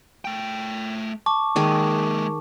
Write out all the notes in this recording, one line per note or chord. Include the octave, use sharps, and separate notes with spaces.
A3 G5
A5 C#6 D6
D#3 G#3 A#3 G#4